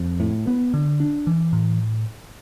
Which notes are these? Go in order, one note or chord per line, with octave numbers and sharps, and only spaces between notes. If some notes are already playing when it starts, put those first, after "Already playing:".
Already playing: F2
A2
B3
D3
D4
E3
A2